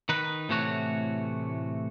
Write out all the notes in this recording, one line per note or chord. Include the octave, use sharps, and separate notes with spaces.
D#3 D#4 B4
A2 C3 E3 A3 F#4 C#5